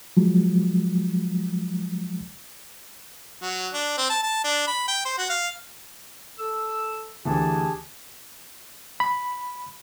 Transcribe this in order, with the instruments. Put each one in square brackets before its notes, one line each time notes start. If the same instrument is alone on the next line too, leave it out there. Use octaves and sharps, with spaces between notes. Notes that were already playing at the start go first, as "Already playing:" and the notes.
[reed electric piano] F3 F#3 G#3
[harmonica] F#3
D4
C4
A5
A5
D4
B5
G5
C5
F#4
F5
[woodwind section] A4 E6
[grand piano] D2 E3 [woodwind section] G4 G#4 A5
[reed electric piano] B5